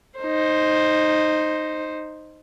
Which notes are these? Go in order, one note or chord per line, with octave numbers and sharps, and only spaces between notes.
D#4 C5